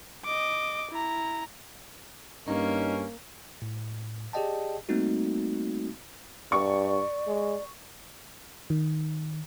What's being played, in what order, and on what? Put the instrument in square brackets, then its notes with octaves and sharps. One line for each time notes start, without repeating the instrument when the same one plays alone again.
[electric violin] D#5 D6
E4 A#5
[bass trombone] G2 [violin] A#3 [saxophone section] C#4 [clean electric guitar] D#4
[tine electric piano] A2
G4 G#4 D5 D#5 G5 A5
G3 A3 A#3 C4 D#4 F#4
[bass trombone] G2 [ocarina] D5 [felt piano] C#6
[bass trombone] G#3
[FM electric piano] D#3